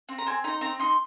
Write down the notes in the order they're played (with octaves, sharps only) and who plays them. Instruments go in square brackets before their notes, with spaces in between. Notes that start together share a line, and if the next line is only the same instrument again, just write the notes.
[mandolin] C4
A#5
C4 G#5
D#4 A#5
C4 A#5
D#4 C6